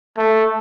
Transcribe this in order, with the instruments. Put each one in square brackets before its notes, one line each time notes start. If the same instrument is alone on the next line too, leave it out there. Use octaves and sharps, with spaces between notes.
[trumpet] A3